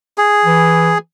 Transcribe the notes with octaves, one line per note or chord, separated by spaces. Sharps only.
G#4
E3